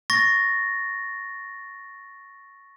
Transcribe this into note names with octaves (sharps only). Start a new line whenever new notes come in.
C#6 A6 A#6